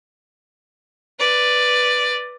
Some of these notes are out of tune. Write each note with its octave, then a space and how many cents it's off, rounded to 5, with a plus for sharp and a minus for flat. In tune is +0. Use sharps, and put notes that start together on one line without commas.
B4 +0 D5 +0